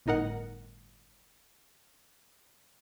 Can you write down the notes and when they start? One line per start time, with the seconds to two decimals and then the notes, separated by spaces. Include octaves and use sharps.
0.06 G1 A2 D#4 A#4 F#5